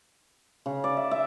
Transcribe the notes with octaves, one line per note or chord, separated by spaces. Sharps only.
C#3
D5
E5
E5